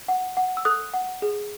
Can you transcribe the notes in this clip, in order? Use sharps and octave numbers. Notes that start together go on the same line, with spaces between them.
F#5
F#5
E6
A4 D#6 F#6
F#5
G#4